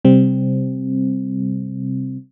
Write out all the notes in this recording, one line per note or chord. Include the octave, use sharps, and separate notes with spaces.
C3 G3 C4